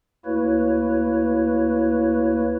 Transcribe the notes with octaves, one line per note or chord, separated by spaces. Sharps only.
D2 A#3 E4 F#4 B4 C#5